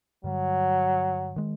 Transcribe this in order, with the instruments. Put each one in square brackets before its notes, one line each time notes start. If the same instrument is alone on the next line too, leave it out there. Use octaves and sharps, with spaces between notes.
[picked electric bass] G2 D3 G3 [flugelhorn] F#3
[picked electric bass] D#3 G#3